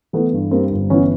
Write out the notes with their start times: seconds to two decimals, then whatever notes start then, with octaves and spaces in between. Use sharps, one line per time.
0.13 E3 A3 B3
0.33 G2
0.51 G3 A#3 C4
0.71 G1
0.90 E3 B3 C#4